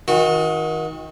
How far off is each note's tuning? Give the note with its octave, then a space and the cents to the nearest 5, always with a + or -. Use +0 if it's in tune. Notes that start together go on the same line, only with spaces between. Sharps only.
D#3 +25 F#4 -30